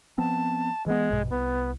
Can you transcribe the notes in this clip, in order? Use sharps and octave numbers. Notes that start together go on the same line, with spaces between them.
F3 B3 C4 A5
E3 G#3 B3
A#1 G2 B2
C2 B3